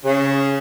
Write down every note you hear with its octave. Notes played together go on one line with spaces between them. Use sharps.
C#3